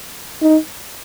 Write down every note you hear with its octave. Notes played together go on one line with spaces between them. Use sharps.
D#4